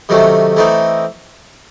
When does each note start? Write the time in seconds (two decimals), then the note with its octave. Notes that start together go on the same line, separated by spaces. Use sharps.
0.09 C3 D#3 F#3 A3 C#4
0.57 E3 A3 C4 D#4